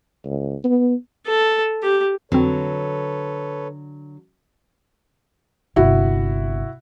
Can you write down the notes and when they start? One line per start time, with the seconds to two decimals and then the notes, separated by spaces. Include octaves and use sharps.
0.25 C#2
0.64 B3
1.26 A4
1.83 G4
2.32 F2 D3 F#3 C4 A4 B4 C#5
5.76 G1 C3 E4 F#4